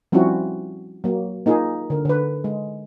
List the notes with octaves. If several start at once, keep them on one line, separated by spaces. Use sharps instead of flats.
F3 G3 C4 C#4 E4 F#4
F#3 A#3
A#3 D#4 F4 G#4
D3 A#4
D3 B4
G#3